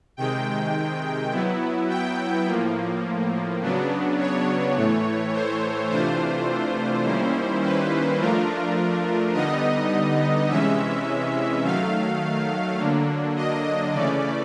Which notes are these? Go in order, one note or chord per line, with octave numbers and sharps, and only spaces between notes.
C3 D#3 G#3 G5
F#3 B3 E4
G5
A2 F3 A#3
C#3 F#3 B3 D4
C#5
A2 E3 A3
C5
C3 E3 A3 D4 F4 C5
D#3 G3 A#3 C#4 E4
B4
F3 A3 D4 F4 A#4
D3 G3 B3 D#4 D#5
C3 E3 G#3 C#4 E5
D#3 F#3 A3 F5
D3 F#3 A#3 D4
D#5
D#5
C#3 E3 A3 C#4 D5